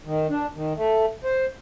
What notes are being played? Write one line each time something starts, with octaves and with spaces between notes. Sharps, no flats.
D#3
D4
D#3
A3
C5